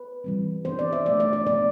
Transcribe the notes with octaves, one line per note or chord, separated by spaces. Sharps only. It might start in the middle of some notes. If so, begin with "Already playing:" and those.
Already playing: B4
E3 G3 C4
E3 B3 D4 C5
D5
E5
F3 A3 D4 D5
D5
D5
F3 B3 D4 D5